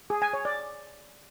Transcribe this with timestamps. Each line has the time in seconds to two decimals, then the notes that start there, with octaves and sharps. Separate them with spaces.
0.10 G#4
0.22 G#5
0.33 C#5
0.45 D5